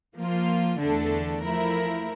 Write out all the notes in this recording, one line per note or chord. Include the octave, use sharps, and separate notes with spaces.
F3 A#3 F4
E2 D3 A3 D4 A4
F3 A3 E4 A#4